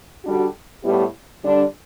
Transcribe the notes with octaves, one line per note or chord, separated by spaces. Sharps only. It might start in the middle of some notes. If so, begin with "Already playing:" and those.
D3 G3 D4 F#4
A2 G3 B3 E4 G4
D3 G3 D4